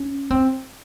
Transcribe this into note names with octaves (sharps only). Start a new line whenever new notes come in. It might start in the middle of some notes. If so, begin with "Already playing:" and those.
Already playing: C#4
C4